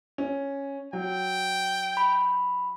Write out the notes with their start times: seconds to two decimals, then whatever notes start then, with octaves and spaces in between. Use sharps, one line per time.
0.18 C#4
0.93 F#3 G5
1.97 B5